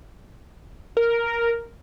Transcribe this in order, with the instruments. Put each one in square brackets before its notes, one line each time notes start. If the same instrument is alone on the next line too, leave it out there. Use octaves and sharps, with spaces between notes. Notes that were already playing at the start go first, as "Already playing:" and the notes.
[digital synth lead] A#4